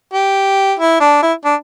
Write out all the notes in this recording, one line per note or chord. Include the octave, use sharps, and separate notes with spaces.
G4
E4
D4
E4
D4